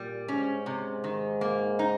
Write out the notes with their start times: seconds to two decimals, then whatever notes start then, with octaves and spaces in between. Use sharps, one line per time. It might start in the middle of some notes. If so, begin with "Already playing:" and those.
Already playing: A#2 G3
0.28 G#2 C#4
0.66 G#2 C3
1.04 D#3
1.41 A#3
1.79 D#4